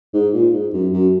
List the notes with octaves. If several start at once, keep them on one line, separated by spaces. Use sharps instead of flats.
G#2
A#2
G#2
F#2
F#2